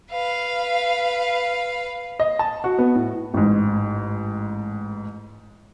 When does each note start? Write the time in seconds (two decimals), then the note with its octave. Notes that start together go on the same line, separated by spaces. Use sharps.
0.12 B4 F5
2.20 D#5
2.39 A5
2.64 F#4
2.78 B3
2.95 A2
3.34 A1 G#2